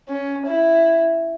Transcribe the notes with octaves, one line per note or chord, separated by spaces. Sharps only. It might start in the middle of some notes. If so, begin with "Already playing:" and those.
C#4
E4